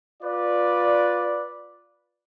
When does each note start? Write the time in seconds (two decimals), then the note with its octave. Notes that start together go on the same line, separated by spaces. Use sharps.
0.22 F4 B4 D5